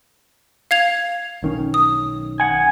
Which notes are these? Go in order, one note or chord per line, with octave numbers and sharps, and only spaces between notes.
F5 G#6 F7
B1 D#3 C#4
D#6
F#5 G#5